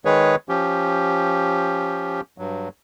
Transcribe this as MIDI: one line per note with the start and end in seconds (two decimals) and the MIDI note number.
0.05 0.36 51
0.05 0.36 56
0.05 0.36 68
0.05 0.36 71
0.05 0.36 73
0.49 2.21 53
0.49 2.21 61
0.49 2.21 67
2.38 2.69 43
2.38 2.69 54